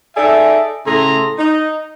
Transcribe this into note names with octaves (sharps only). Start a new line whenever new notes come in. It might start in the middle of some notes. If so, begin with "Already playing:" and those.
D#4 G#4 A4 D5 E5
A2 C#3 A3 G#4 A#5 C6
D#4